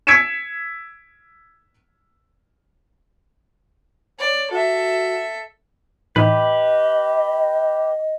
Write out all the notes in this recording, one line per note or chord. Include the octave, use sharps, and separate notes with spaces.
E6 G#6 B6 C#7 D7 E7
C#5 D5
F#4 A4 E5
A2 E3 D#4 G4 B4 D#5